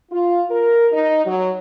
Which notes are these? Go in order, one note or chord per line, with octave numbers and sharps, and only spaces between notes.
F4
A#4
D#4
F#3